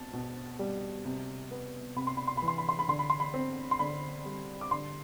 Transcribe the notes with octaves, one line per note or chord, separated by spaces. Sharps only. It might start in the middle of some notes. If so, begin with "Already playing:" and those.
Already playing: B2 C4 A5
B2
G3
C3
B3
C3 B5
C6
B5
C6
E3 B5
C6
B5
C6
B5
D3 C6
B5
C6
B5
C4
C6
D3 B5
G3
D6
D3 C6